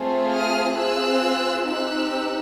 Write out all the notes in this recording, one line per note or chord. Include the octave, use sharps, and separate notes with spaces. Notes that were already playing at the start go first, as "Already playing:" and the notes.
Already playing: A3 C4 F4 G#4
D#6 F6
C4 F4 G#4 E6 F#6
C4 D#4 G4 E6 F#6